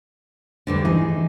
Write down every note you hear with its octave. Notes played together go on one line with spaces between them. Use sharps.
D2 G2 D3
E3 D#4 G#4